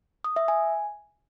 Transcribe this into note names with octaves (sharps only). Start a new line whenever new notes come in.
D#6
E5
G#5